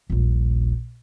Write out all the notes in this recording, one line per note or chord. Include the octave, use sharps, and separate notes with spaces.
D#1 A#1